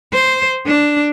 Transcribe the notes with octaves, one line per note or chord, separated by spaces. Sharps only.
C5
D4